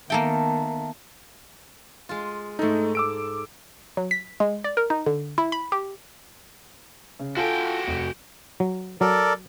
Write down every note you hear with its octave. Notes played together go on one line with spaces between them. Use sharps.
D#3 A#3 B3 A4 E5 G5 A5
G#3 F4
G#2 A3 D#4 A4
D6 E6 D7
F#3
B6
G#3
D5
A#4
D#4
D3
E4
B5
G4
C#3
F4 F#4 A4 G5 G#5
F1
F#3
F#3 A4 A#4 D5